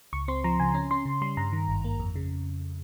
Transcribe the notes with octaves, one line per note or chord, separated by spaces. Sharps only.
C#2 C#6
C4 C6
F3 A#5
C#3 G#5
C#4 A#5
C#4 C6
C#3
G3 C6
G2 A#5
D#3
G#1
A#3
F2
C#3